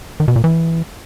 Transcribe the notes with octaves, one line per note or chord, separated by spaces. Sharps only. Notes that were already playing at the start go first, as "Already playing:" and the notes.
D#3
B2
A#2
E3